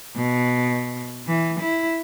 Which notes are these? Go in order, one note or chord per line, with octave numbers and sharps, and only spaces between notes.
B2
E3
E4